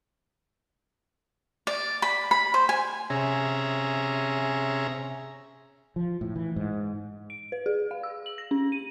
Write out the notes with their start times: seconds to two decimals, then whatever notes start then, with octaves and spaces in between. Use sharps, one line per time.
1.67 D5
2.02 B5
2.31 B5
2.54 C5
2.69 G#5
3.10 C3 C#4 G#4 E5 A#5
5.96 F3
6.21 A2
6.36 E3
6.56 G#2
7.30 D7
7.52 B4
7.66 G#4
7.91 F5
8.03 E6
8.26 F#7
8.38 A#6
8.51 C#4
8.72 D#7